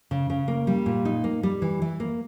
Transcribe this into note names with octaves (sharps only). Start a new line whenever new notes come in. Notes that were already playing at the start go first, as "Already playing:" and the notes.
C#3
C#3
A#3
G3
A#2
D#4
A#3
G3
E3
E3
A#3